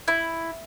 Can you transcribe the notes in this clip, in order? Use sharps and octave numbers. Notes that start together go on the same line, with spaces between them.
E4